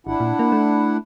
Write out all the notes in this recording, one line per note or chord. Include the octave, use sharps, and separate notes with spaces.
G#1 D4 E4 F#5
A#2
A#3
A3